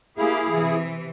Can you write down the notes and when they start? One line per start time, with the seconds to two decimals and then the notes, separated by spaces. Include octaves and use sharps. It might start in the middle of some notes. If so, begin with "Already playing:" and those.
0.17 A#3 E4 G4 G#4 F5
0.52 C3 E3